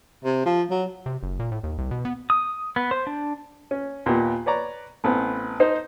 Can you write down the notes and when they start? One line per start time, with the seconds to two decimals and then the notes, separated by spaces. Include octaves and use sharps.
0.25 C3
0.46 F3
0.70 F#3
1.06 C3
1.23 F#1
1.40 A#2
1.52 A2
1.63 D#2
1.78 C2
1.91 B2
2.05 B3
2.30 D#6
2.76 B3
2.91 C5
3.07 D4
3.71 C#4
4.06 D#2 A#2 B3 G4
4.46 B4 C#5 D5 A#5
5.04 A1 B3 C4
5.60 D#4 C5